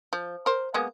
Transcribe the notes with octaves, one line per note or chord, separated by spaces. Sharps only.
F3
A#4 C5
G#3 A#3 B3